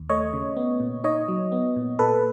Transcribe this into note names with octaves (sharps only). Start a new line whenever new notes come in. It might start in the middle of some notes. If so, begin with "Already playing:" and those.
Already playing: D#2
A3 C#5 D#5
C#3
B3
A#2
D#4 C#5 D#5
F#3
B3
A#2
A#2 A4 B4